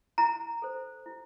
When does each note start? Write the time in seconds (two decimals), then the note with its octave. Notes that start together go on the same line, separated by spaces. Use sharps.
0.18 E4 A#5
0.62 A4 C5
1.06 E4